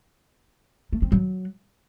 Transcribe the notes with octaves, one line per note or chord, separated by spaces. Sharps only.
A3
C4
F#3